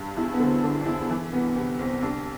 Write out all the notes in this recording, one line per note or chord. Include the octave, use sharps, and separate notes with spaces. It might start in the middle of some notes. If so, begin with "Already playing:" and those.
Already playing: G2
E2 E4
B3
D3 C4
D3 D4
D4
E2 E4
E3
C2 B3
C3 B3
C2 C4
C2 D4